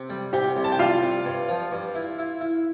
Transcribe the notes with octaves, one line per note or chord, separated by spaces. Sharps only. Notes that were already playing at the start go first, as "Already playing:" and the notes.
Already playing: C3
G3
C3 G4 G5
C2
A5
G5
G3 F4 F5
C3
G2
F3
G2
E4
E4
E4